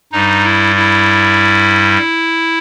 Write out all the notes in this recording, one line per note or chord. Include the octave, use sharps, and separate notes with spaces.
G2 G3 D#4
E4
E4